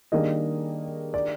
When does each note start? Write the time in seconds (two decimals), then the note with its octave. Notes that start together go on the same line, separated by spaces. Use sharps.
0.12 D#3 G3 A#3 D4 G#4 D#5
1.14 D5